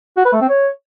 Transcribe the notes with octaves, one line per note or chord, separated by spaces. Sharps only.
F#4
B4
A3
C4
C#5